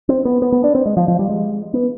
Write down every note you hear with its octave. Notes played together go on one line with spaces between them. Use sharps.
C4
B3
B3
B3
D4
C4
G#3
F3
F3
G3
G#3
B3